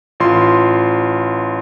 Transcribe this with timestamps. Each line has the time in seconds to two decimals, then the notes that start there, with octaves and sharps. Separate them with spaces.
0.20 A1 F4 C6